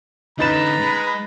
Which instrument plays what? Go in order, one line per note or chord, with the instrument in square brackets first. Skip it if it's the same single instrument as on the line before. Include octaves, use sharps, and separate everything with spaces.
[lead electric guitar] D3 C#4 [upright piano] D#4 A6 E7 [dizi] B4 [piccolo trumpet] A#5
[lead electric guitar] G#3